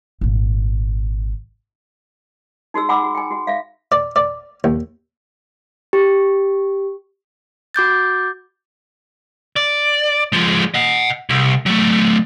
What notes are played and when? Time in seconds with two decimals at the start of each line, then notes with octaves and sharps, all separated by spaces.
0.21 G#1 A#2
2.74 D#4 F#4 G#4 E6
2.89 F#5 G#5 B5 D6 E6
3.03 F#4
3.15 G5 G#5
3.31 F#4
3.47 E5 F5
3.92 D5
4.16 D5
4.64 D#2
5.93 G4
7.74 F#4 D6 G6 A6
9.56 D5
10.33 F3 G#3
10.74 D#5 F#5
11.30 C2
11.66 F#3 A3